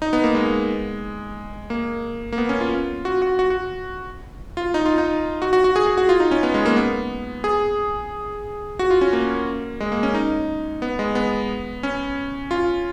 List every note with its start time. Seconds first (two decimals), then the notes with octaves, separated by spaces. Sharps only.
0.02 D#4
0.13 B3
0.24 A#3
0.35 G#3
1.70 A#3
2.32 A#3
2.38 B3
2.49 C#4
2.61 F4
3.05 F#4
3.22 F#4
3.39 F#4
3.50 F#4
4.57 F4
4.74 D#4
4.86 F4
4.98 D#4
5.42 F#4
5.53 F#4
5.64 F#4
5.76 G#4
5.87 G#4
5.98 F#4
6.09 F4
6.20 D#4
6.31 C#4
6.43 B3
6.54 G#3
6.66 A#3
6.76 B3
7.44 G#4
8.79 F#4
8.91 F4
9.01 C#4
9.13 A#3
9.80 G#3
9.92 A#3
10.03 C#4
10.14 D#4
10.82 B3
10.99 G#3
11.15 B3
11.83 C#4
12.51 F4